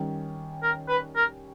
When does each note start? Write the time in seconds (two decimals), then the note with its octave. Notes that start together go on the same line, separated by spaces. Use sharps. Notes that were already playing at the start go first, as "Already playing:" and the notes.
Already playing: D#3 G3 C#4
0.63 A#4
0.89 B4
1.16 A#4